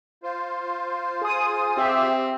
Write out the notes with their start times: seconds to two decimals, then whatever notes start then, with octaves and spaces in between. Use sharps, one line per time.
0.23 F4 C5
1.22 G#4 D#6
1.77 C4 G4 E5